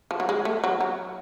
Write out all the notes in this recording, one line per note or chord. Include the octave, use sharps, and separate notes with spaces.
F3
F#3
G#3
A3
F#3
F#3